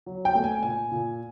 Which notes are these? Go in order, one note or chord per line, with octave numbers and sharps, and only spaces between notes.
F#3
G5
A3
G#5
A#2 G#5
A#2